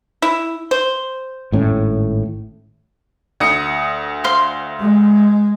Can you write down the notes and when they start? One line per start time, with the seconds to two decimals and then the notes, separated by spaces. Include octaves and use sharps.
0.22 E4
0.71 C5
1.52 G#1 A2 C#4
3.40 D2 D#6 C#7
4.24 C5 F5 C6
4.81 G#3